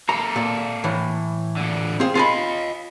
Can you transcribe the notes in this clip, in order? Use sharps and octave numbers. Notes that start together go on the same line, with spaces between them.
A#3 A4 A#5
A#2
A2 E3
A#2 D3
C4 F4 G#4
F4 D#5 F5 G#5 B5